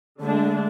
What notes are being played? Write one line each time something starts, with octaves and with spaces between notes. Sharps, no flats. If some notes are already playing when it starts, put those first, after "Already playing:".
D3 G#3 A3 D4